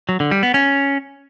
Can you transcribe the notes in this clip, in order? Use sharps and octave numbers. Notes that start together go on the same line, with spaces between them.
F#3
D3
G3
B3
C#4